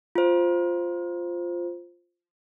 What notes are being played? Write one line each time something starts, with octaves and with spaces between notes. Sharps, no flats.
F4 C5